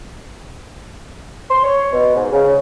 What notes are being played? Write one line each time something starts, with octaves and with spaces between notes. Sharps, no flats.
C6
C#5
B2
G#2
C#3